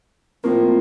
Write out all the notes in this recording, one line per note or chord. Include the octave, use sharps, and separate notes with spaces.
A2 F3 A#3 C4